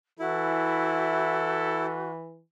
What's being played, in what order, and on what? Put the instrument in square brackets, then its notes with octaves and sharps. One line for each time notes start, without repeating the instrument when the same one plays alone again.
[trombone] E3 [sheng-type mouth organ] E4 [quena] F#4 [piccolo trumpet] A4